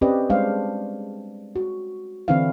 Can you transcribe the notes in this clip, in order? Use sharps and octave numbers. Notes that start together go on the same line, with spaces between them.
C4 C#4 G4 B4 D5 D#5
G3 G#3 D4 C5 F5
F#4
D3 E3 C4 D4 E4 F5